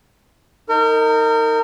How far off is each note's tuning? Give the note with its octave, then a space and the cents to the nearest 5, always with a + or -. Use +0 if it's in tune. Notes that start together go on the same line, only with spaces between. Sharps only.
D#4 +10 A#4 -30